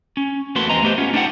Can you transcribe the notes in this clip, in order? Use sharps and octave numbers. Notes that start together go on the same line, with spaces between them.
C#4
E2 A3 A#3 F#4 B4 C6
E2 G#3 C4 D#5 A#5
A3 B3 G4 B4 C5
B3 C#4 F4
D4 D#4 G4 C#5 F#5 G5